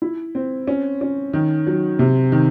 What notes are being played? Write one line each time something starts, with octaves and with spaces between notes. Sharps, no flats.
E4
C4
C#4
C#4
D#3
F#3
C3
D#3